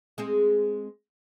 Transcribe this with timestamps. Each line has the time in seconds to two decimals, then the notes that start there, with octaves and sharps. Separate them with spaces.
0.18 G#3 C4 G#4